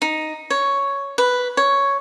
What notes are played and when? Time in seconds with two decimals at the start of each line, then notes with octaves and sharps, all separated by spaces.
0.02 D#4
0.50 C#5
1.18 B4
1.57 C#5